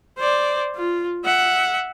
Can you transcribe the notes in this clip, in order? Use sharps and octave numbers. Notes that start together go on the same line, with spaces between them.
C5 D5
F4
E5 F#5